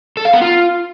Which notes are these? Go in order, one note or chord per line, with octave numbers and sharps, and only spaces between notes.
A4
F5
B3
F4